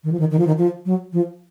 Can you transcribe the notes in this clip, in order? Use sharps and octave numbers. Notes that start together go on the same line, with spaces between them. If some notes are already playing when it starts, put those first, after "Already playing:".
D#3
F3
D#3
D#3
F3
D#3
F3
F#3
F3